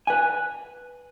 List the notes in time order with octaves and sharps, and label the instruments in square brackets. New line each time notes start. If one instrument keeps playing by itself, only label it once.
[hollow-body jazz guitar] B4 G#5